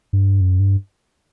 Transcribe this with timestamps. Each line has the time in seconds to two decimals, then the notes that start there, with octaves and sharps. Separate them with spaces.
0.13 G2
0.41 F#2
0.60 G2